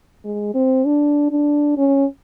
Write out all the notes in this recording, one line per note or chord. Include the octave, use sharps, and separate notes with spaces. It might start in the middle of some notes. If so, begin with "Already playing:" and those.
G#3
C4
D4
D4
C#4